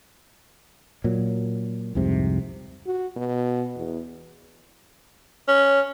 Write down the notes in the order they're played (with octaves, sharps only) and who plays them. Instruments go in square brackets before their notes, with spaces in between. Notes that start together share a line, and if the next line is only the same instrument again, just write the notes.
[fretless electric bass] A#2 F#3
C2 F2 G#2 C3
[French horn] F#4
B2
E2
[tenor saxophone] C#4